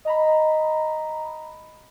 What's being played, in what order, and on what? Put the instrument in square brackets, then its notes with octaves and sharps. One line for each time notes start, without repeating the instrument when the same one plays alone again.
[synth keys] D#5 A#5 B5